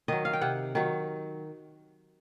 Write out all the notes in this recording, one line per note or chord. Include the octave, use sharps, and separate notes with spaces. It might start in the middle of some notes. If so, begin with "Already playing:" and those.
D#3 F#3 D#5
F5
G5
C3 F#5
D#3 F#3